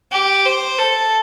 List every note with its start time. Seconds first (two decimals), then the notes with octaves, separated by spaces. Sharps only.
0.12 G4
0.45 C5
0.79 A4